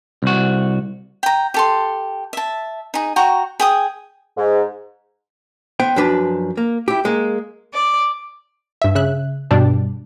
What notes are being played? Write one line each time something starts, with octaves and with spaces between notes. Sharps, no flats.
C2 F#4
G5 A#5
G4 A4 C6
E5 A5
D#4 G#4
F#4 G5 A#5 C#6
G#4 G5 D#6
G#2
B3 C5 G5
F#2 F3 D4 B4 D5
A#3
E4 G4
G#3 A#3
D5
G2 E5
C#3 E5 F#6
G2 B2 G3 D4